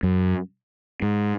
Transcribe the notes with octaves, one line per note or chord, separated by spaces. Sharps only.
F#2
G#2